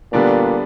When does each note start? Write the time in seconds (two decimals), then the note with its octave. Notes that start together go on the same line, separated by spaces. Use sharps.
0.13 A#2 D3 G3 B3 D4